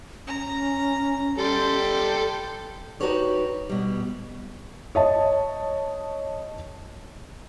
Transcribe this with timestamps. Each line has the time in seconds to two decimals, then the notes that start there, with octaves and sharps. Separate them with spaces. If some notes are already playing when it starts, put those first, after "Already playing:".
0.27 C#4 A#5
1.38 G3 A4 G5 C6
3.00 D#4 F#4 G4 B4 C#5 D5
3.69 B2 G3
4.95 C#5 D#5 A5